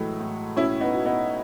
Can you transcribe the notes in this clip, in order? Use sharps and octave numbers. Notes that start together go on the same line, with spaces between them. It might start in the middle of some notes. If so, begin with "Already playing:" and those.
Already playing: A2 E3 F#3 G#3 A3
A2
B2 C#4 E4
B3 D#4
B2
B3 D#4